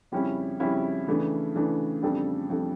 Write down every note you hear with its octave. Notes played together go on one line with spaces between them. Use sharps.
F2 C#3 G3 C#4 E4
F2 C#3 G3 C#4 E4
C#3 E3 A3 D4
C#3 E3 A3 D4
F2 C#3 G3 D4 A4
F2 C#3 G3 D4 A4